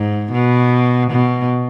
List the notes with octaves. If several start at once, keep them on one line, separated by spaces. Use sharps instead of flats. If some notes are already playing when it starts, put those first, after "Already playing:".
Already playing: G#2
B2
B2